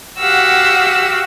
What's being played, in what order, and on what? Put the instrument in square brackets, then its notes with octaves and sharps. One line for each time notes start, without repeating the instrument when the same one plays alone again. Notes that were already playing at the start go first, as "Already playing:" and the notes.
[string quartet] F#4 G4 F5 F#5 E6